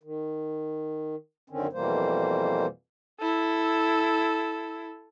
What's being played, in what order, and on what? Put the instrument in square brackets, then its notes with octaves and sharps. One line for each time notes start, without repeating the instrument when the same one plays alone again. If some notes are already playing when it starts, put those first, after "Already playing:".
[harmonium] D#3
F#2 D3 D#3 C4 C#4
F2 B2 E3 G3 A#3 C5
[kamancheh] E4 A4